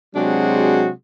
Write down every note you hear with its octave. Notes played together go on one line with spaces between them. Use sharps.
C3 F#3 G#3 D4 F#4 G#4